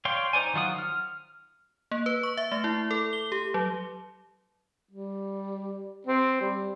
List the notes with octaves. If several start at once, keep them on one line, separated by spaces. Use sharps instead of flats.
C#5 D5 F5 G5 C6
D#4 C5 D5 G#5
D#3 F#3 F4 F#5 D#6
F6
A#3
B4
C#6
E5
A3
E4
A4
G7
G4
F#3
G3
C4
G3